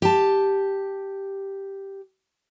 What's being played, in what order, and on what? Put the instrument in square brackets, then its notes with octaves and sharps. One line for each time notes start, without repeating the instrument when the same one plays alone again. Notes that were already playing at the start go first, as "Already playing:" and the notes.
[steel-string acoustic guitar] G4 A5